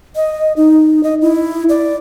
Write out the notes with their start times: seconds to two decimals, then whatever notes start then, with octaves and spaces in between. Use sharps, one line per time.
0.16 D#5
0.56 D#4
1.03 D#5
1.22 E4
1.69 D5